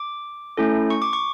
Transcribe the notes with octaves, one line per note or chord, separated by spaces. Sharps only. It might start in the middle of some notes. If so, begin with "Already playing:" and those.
Already playing: D6
A3 C#4 E4 A4
C#6
D6
C#6